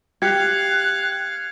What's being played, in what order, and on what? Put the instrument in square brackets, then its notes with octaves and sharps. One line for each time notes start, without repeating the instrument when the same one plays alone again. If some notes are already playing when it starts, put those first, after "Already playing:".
[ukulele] G4 [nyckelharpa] F5 [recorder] F#6 [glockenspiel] G#6 C#7